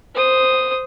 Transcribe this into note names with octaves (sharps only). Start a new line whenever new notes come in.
C5 D#6